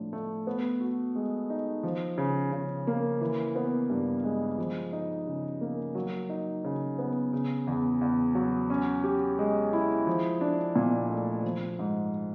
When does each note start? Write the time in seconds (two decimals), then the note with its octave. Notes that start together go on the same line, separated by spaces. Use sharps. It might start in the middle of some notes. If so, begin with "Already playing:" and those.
Already playing: A2 F3 D4
0.13 A3
0.47 B3
0.80 F#4
1.15 G#3
1.50 D#4
1.83 F3
2.18 C#3
2.52 C#3
2.87 A#3
3.21 E3
3.56 B3
3.90 G2
4.24 G#3
4.58 F3
4.93 D#4
5.27 C#3
5.61 A#3
5.95 F#3
6.29 D#4
6.64 C#3
6.99 B3
7.33 C#3
7.67 E2
8.01 E2
8.35 F#3
8.70 C#4
9.04 G4
9.39 G#3
9.73 E4
10.07 F3
10.41 D4
10.76 A#2
11.10 A3
11.44 F3
11.79 G#2